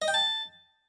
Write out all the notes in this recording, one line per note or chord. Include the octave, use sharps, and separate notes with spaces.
D#5
G5
A5